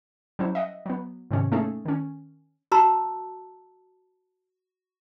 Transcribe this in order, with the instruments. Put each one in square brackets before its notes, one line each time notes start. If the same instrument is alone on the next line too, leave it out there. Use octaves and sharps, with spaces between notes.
[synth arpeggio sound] F#3 G3 C#4 E4 C5
D#5 E5 F#5
F#3 B3
G#2 C3 D#3 C#4
A3 A#3 C#4 D#4 G#4 A4
D#3 C#4
[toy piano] F#4 A5 A#5 C6 E6